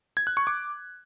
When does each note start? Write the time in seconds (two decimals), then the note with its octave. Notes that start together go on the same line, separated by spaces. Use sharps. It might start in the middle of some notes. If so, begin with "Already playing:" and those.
0.17 G#6
0.27 F#6
0.37 C#6
0.47 D6